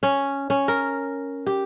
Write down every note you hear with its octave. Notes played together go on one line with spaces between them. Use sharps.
C#4
C#4
A#4
G4